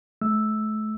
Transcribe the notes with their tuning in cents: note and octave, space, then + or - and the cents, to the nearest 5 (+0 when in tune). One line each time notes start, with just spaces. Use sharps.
A3 -35 E6 +0